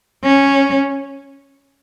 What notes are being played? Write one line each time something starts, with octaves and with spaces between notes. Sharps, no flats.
C#4